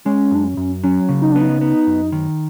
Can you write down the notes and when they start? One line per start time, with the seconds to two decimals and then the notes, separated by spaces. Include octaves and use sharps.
0.05 G#3 C#4
0.31 F#2 D4
0.44 C#4
0.57 F#2
0.84 F#3 C#4
1.09 C#3
1.22 D#4
1.32 B3 D4
1.41 D#4
1.61 B3
1.87 F#2
2.12 D#3